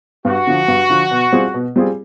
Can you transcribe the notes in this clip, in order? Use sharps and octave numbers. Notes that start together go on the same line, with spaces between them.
G2 F#4
D3 F3
G2
D3 F3
B2
G3 C4 F4 G#4
B2
G3 C4 F4 G#4